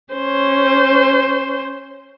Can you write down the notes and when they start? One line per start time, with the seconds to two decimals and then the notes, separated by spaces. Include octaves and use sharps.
0.14 C#4 C5